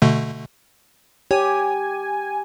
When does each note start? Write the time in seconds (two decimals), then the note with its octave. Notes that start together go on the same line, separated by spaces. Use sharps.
0.02 B2 D3 A3
1.31 G4 C#5 G#5